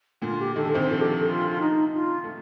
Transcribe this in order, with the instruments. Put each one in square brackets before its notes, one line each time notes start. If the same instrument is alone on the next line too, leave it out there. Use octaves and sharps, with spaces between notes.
[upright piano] A#2 D3 [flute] F4
[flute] G4
[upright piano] D#3 [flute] A4
[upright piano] D3
[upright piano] C3 D#3 [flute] C5
[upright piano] D3 F3 [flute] A4
[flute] G4
A4
F4
F4
D#4
F4
[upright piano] A3